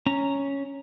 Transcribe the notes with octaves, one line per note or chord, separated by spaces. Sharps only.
C#4 A#5